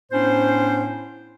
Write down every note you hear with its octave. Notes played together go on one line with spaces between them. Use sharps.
A2 B3 C#4 D4 C5